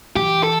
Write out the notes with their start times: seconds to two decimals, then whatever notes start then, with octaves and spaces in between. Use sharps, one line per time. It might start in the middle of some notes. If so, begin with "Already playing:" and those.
0.16 E3 G4
0.43 A4